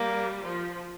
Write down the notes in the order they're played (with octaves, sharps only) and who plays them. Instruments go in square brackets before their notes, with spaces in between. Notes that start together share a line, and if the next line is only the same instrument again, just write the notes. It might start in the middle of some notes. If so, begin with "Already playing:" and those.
Already playing: [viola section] G3 [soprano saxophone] A#3
[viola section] F3